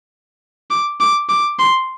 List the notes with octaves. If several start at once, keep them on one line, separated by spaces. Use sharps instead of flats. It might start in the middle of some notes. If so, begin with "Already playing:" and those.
D6
D6
D6
C6